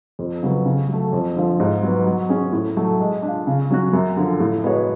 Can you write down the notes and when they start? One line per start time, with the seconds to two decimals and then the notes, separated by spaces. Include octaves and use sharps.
0.19 F2
0.43 C#3 F#3 B3
0.65 C#3
0.88 F#3
0.93 A3
1.13 F2
1.36 D3 F3
1.60 G#2
1.83 F#3 B3
2.06 F#3
2.29 C#4 G#4
2.52 A2
2.77 F#3 A3
3.00 G#3
3.22 D4
3.28 F4
3.47 C#3
3.70 F#3 C#4 F#4
3.93 F#2
4.17 D3 F3
4.40 A2
4.63 G#3 B3 F#4 C#5